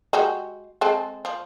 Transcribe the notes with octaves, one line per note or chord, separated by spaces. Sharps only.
G#3 F#4 G4
G#3 C4 A4
F3